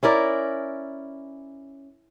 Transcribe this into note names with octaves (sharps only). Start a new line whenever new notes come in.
C#4 E4 A#4 D5